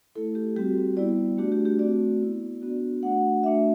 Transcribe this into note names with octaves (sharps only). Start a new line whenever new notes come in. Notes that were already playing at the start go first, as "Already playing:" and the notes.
A3 E4 A4
G4
G3 C4 F#4 G4
G3 B3 E4 D5
A3 D4 F#4 G4
G4
G4
A3 C4 F#4 D5
B3 E4
B3 D4 F#4
A3 D4 F#4 F#5
A3 D4 F#4 E5